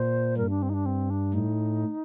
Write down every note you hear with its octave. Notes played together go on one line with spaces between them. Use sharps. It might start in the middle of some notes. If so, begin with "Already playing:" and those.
Already playing: A#2 C5
G2 A#4
D4
C4
D#4
D4
C4
D4
A2 D#4